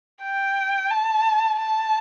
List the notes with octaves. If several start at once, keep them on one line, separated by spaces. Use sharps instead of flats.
G5
A5
A5